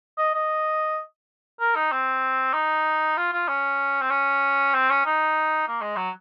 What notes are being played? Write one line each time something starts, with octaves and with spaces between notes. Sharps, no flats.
D#5
D#5
A#4
D#4
C4
D#4
F4
F4
C#4
C4
C#4
C4
C#4
D#4
A#3
G#3
F#3